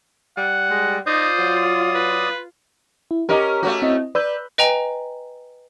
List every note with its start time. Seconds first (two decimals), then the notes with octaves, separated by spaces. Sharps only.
0.37 G3 F#5
0.70 G#3
1.07 D#4 F4 C5 D5 D#6
1.39 F#3
1.95 B4
3.11 E4
3.29 C#4 G4 A#4 D#5 D6
3.63 A3 C#4 F#4
3.82 C4 E4 D#5
4.15 B4 D5 E6 G6
4.58 B4 D#5 G5 G#5 A#5